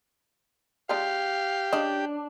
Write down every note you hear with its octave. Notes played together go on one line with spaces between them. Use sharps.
G#3 D4 F4 G4 F5
C#3 D4 D#5